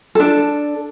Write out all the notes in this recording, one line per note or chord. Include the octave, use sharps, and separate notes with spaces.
D4 A4